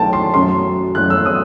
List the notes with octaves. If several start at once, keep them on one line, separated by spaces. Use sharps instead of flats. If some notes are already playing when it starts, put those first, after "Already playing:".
Already playing: B1 B2 F#3 A3 G5 A5
C6
F#2 F#3 A3 C6
F#2 F#3 A3 F#6
E6
D#6